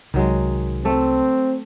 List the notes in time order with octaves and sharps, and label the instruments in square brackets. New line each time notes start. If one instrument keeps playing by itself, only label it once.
[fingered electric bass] C2 [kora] D#3 F#3 G#3
[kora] A3 A4 [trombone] C4